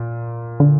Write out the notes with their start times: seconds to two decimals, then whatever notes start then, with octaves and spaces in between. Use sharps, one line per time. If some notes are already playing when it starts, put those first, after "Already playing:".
Already playing: A#2
0.60 D3